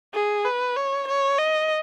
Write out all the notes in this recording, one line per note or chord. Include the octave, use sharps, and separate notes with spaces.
G#4
B4
C#5
C#5
D#5